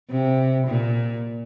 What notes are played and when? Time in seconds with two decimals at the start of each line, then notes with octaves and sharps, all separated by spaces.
0.10 C3
0.67 A#2